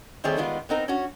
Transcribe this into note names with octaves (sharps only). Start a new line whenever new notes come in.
D#3 G3 A3 C4 G#4 C#5
D#3 G3 G#3 B3 D#4 F4
B3 C4 D#4 A#4
C#4 F#4